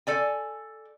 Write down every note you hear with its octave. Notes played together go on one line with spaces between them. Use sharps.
A4 D5 G#5